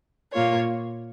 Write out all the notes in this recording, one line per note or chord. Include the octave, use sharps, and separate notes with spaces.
A#2 A#3 F4 C#5